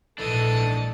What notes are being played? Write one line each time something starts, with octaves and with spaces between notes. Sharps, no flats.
A#1 G#2 E3 D4 A4 D#5 A5